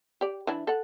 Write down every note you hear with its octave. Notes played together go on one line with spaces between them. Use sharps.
G4 D5
E3 D4 E4
A4 F#5